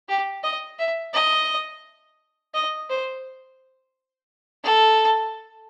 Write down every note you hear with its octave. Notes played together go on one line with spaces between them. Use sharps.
G4
D#5
E5
D#5
D#5
C5
A4